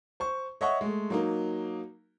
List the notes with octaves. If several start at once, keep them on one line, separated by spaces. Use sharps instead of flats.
C5 C#6
C#5 D#5 E5 F#5 C#6
G#3 A3
F#3 A#3 D#4